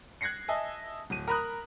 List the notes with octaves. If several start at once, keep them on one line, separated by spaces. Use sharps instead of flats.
F#6 G#6 A#6 C7 C#7
D#5 E5 G#5 A5
D1 D#7
A#4 A#5 B5 D#6 F#6